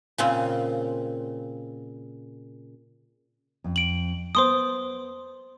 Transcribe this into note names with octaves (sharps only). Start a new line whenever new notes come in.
A#2 C#3 C4
F2
D7 F#7
B3 C5 A5 C6 D#6